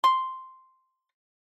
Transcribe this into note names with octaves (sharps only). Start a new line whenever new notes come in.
C6